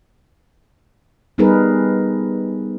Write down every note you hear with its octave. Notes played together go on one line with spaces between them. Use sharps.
G3 B3 D#4 G#4 A#4 B4